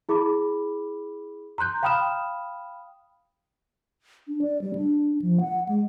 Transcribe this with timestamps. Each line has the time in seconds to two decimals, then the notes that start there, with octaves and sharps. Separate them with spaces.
0.09 E4 G#4 B5 D6
1.58 A#5 C6 F#6 G6
1.83 F5 G5 B5 D#6 F6 E7
4.28 D4
4.42 D5
4.61 G3
4.75 D4
5.22 F3
5.41 F#5
5.69 G#3